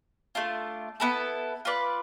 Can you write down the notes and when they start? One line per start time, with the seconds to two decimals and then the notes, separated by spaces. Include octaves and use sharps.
0.35 A3 D4 F4
1.00 B3 E4 A4
1.65 F4 B4 D5